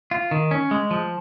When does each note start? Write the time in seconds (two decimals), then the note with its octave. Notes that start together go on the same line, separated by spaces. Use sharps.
0.11 F4
0.31 D#3
0.51 C#4
0.71 G#3
0.91 F3